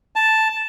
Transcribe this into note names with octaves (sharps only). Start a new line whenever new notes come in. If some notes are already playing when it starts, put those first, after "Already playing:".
A5